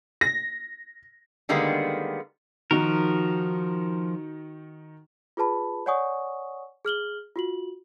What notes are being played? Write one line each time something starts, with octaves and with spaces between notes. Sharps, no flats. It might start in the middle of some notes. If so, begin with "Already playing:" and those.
A#6
D3 D#3 G3 G#3 A#3 B3
D#3 F3 D#4 F#4 A#4
F4 G#4 B4 A5 B5
C#5 D5 F#5 G#5 C#6 D#6
G#4 F6 F#7 G7
F4 F#4 F#7